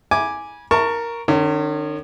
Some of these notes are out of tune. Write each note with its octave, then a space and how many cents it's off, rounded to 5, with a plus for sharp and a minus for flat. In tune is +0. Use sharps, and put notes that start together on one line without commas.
G#5 +0 B5 -35 D6 +0
A#4 +0 A5 +25 C#6 +0
D#3 -40 C#4 +0